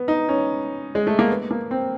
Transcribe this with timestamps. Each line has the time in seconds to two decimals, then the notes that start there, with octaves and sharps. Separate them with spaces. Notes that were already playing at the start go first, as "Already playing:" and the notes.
Already playing: B3
0.08 D#4
0.29 C#4
0.95 G#3
1.07 A3
1.19 A#3
1.30 B3
1.51 A#3
1.71 C4